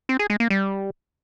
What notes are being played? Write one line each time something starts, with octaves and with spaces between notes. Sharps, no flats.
C4
G#4
G#3
A#3
G3